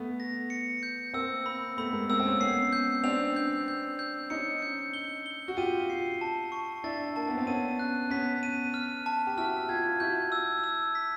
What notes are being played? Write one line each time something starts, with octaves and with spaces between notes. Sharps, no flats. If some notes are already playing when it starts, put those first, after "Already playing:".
Already playing: A3 B3
A#6
C#7
G6
A#3 C4 E6
B5
A3 B3 B5
G#3 A#3
A#3 C4 E6
C4
B3 C#4
B3 C#4 C7
G6
C4 D4 F7
G6
G6
G6
C#4 D#4 C#7
G6
G7
G7
F#4
F4 G4 D#7
C7
A5
C#6
D4 E4 A6
A#3 A5
B3
C4
B3 C#4 D#7
F#6
B3 C#4 B6
D#7
F6
A5
G4
E4 F#4 F6
F4 G4 G#6
E4 F#4 G6
E6
E6
B6